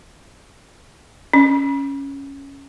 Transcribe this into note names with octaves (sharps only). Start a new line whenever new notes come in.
C#4